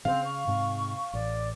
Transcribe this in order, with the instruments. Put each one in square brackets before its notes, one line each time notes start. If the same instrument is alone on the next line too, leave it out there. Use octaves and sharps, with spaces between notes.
[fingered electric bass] C#3 [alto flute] C4 [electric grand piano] F5
[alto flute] C#6
[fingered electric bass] G#2 C3 C4
[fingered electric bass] A1 [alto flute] D5